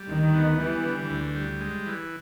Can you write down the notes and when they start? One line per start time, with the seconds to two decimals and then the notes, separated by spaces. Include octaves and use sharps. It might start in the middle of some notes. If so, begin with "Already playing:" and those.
Already playing: G3
0.09 D2 D#3
0.34 B3
0.59 E3 G3
0.85 D3
1.10 D2
1.35 G3
1.61 G#3
1.86 E3